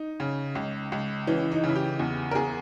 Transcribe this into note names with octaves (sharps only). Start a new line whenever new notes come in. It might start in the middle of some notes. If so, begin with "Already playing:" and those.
Already playing: D#4
C#3
C#2
C#2
E3 C#4
D#4
C#3 E4
G4
E2
A#4
E2 G#4